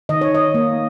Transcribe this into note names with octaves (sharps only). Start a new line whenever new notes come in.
D#3 D#5
C#5
D#5
A#3